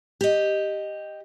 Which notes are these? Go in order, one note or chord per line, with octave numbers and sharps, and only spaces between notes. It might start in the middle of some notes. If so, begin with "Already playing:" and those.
G4 D#5